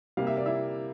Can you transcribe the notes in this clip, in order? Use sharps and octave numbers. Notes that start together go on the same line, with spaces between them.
C3 G3 A#3 F5
E5
D5
E4 E5